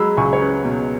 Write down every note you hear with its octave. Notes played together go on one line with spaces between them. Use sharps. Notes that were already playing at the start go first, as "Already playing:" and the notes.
Already playing: F#3 G#3 B5 E6
C#2 G#5 C#6
C#5
C#4 B4
B2